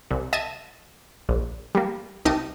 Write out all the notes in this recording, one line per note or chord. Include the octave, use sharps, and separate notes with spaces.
C2
D#5 E5 A5 G#6 A#6 D#7
A#1
G3 A#3
C2 D#4 G4 A#4 A5 D#6